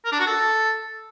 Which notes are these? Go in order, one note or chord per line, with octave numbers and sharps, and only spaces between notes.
A#4
D4
F#4
A4